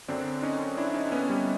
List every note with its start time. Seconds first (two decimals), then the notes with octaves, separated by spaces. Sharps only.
0.08 F#2 D3 F#3 C4 D4
0.42 C#4 D#4
0.77 D4 E4
0.94 C#4 D#4
1.12 B3 C#4
1.29 G3